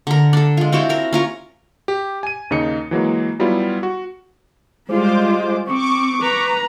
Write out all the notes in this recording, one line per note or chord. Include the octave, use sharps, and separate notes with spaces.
D3 A#4
D4 A4
G#3 F4
C4 E4 F#4 G4
C4 A#4
C#4 F4 A#4
G4
G#5 D#7
D#2 C#3 D#4 C#7
E3 F#3 G#3 A#3
F#3 G3 B3 E4 F4
F#4
G3 G#3 F4 C5 D6
C4 C#6 D6
B4 A#5